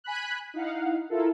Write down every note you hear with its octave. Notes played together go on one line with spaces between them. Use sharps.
G#5 B5 F#6
D#4 E4 F5 F#5
E4 F4 A4 A#4